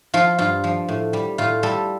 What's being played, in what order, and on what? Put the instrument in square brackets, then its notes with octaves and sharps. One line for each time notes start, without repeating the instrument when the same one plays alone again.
[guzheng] F3 F4
G2 F4
F3
A2
G3
A2 F4
G3 A4